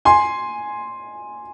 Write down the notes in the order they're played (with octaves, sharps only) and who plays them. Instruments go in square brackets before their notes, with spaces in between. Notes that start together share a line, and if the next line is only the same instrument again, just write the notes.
[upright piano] G#5 C6